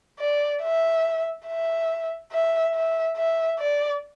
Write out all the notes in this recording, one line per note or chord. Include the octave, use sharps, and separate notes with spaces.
D5
E5
E5
E5
E5
E5
D5